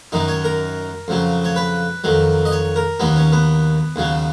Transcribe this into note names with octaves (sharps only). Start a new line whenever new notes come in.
F#2 D#3 F#3 D#4
C#5
A#4
F2 C#3 F#3
C#5
B4
F2 D#3 F#3
D#5
C#5
A#4
D#2 D#3 F#3 B3
C#4
B3
D#2 C#3 F#3